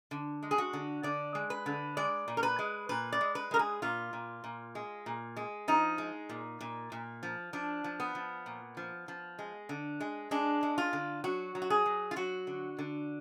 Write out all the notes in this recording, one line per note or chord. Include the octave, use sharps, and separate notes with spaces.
D3
G#3
G#4
F#4
D3
D3 D5
G#3
B4
D3
G#3 D5
A#2
A#4
B4
G#3
A#2 B4
D5
G#3
B4
G#3 A#4
G#4
A#2 F4
A#2
A#2
G#3
A#2
G#3
F3 D#4
G#3
A#2
A#2
A#2
F3
F3 D4
F3
B3
F3
A#2
F3
F3
G#3
D3
G#3
G#3 D4
G#3
F4
D3
F#3 F#4
F#3
F#4
G#4
F#3
F4
F#3 F#4
D3
D3